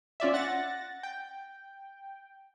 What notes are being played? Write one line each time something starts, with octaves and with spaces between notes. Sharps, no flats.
C#4 F4 D5 E5
F#5 A6 A#6
G5